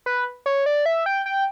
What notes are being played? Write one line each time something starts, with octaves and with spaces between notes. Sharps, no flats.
B4
C#5
D5
E5
G5
G5